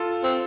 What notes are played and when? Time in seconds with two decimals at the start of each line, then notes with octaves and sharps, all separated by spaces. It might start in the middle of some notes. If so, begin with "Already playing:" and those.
Already playing: F4 A4
0.23 C4